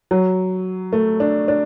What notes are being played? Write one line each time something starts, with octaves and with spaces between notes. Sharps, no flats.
F#3
A3
D4
D4